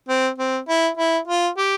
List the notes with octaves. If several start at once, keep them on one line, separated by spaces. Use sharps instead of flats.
C4
C4
E4
E4
F4
G4